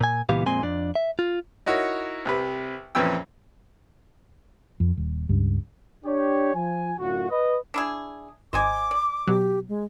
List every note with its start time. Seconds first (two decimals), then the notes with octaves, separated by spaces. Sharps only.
0.01 A#2 G#5
0.29 C#2 A#2 E3 B3 G4 F5
0.46 F2 A#2 G#3 C4 G#5 C6
0.63 F2 D4 D5
0.95 E5
1.19 F4
1.66 D#4 E4 F#4 A#4 C#5
2.25 C2 C3 B4
2.95 F2 A#2 E3 C#4 G5 E6
4.80 F2
4.97 D#1
5.29 C#2 G2
6.05 D4 G4 C#5
6.54 F3 G#5
6.99 F#2 A2 D3 F4 F#4
7.30 B4 D#5
7.74 D4 E4 G#4
8.53 G#1 C5 D#5 G#5 D6
8.91 D5
9.27 B2 F#3 G4
9.69 G#3